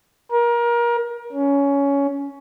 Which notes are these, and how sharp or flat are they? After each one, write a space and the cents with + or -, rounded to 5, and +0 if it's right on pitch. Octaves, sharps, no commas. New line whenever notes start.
A#4 +25
C#4 +15